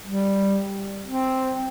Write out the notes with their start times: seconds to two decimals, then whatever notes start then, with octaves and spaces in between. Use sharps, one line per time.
0.06 G3
1.07 C4